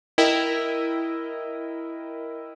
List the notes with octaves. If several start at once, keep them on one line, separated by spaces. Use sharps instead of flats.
E4 A#4 D#5 G5